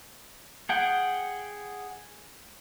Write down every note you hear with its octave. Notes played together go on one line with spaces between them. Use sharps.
G#4 F#5 G5